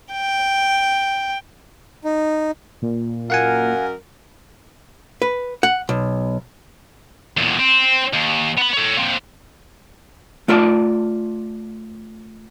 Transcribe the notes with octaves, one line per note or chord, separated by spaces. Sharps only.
G5
D#4
A#2
F#2 A#4 F5 F#5 G#5
B4
F#5
B1
E2 A#2
C4
D#2
B3 B5
A4 C#5
A#3 C4
A3 F4 D5 A5